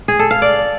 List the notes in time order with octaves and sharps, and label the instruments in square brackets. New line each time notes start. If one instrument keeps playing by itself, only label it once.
[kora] G#4
A4
F5
D5